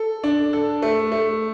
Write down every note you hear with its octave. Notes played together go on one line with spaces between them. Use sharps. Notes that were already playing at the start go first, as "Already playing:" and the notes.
Already playing: A4
D4
A4
A3
A3